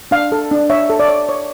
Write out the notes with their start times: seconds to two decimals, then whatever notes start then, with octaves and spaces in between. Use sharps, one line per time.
0.11 D4 F5
0.32 A4
0.51 D4
0.70 C#5 E5
0.90 A4
1.00 D5
1.08 C#5
1.29 C#5